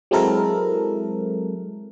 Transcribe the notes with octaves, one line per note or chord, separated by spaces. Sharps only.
F#3 G#3 C4 E4 A4 A#4